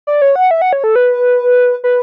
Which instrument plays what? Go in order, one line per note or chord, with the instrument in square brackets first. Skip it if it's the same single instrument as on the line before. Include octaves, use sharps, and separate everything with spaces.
[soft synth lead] D5
C#5
F#5
E5
F#5
C#5
A4
B4
B4